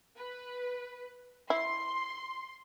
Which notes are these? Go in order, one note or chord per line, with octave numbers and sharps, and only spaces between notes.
B4
E4 C6